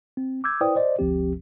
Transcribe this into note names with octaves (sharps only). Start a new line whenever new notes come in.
C4
D6 E6 G6 G#6
E4 B4 C5 D5 G5 D#6
C5 D5 D#5
G1 D2 F3 C4 G4